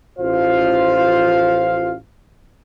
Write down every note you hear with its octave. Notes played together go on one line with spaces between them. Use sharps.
A1 F4 C5 F5